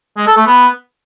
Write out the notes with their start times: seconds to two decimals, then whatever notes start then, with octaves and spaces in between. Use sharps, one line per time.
0.17 G#3
0.27 A4
0.37 A3
0.47 B3